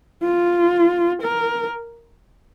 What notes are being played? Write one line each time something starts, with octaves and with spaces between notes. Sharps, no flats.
F4
A#4